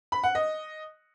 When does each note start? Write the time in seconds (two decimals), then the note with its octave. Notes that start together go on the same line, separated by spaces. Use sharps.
0.12 B5
0.23 F#5
0.35 D#5